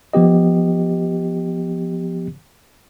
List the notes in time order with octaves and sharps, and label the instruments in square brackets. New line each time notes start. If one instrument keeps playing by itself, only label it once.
[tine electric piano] F3 B3 G4 D#5